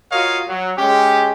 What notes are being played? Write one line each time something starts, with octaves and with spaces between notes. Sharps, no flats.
F4 F#4 A#4 C#5 D#5 F5
F#3
G#3 C#4 G4